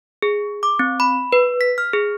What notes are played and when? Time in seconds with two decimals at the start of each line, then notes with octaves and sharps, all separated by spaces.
0.22 G#4
0.63 D6
0.79 C4
1.00 B5
1.32 B4
1.61 B6
1.78 F6
1.93 G#4